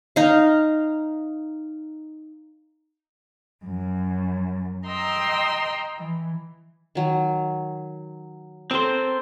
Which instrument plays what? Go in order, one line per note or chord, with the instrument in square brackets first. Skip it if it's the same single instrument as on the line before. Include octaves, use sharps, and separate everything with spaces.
[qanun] D#4 F5
[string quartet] F#2
D#5 G5 A#5 C6 E6
E3
[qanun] D#3 F#3
[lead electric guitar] C4 C5 [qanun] A4 A#4